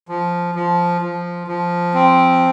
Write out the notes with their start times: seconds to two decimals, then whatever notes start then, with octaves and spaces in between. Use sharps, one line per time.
0.09 F3
0.55 F3
1.02 F3
1.47 F3
1.94 C4